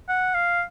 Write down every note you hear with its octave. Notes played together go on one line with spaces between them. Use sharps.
F#5
F5